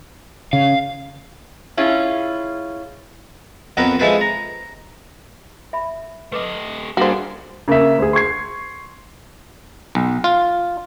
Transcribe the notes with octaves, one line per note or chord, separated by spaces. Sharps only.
C#3 F5
C#4 E4 F4 G#4
F2 B3 C4 A#4 B4
E3 F3 G#3 A4 B4 C5
A#5
E5 B5
A3 B4 D#5 D6
G2 A#3 D4 F#4 G#4 C5 F5
C#3 A#3 C#4 E5
D2 G#4
C6 C#6 G#6 C7
B1
F4